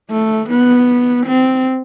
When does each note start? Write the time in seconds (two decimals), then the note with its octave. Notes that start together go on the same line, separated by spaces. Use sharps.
0.11 A3
0.50 B3
1.26 C4